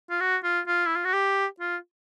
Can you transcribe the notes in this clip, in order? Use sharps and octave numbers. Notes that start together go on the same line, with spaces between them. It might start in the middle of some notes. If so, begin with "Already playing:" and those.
F4
F#4
F4
F4
E4
F4
F#4
G4
F4